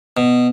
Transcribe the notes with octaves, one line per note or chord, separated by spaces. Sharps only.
B2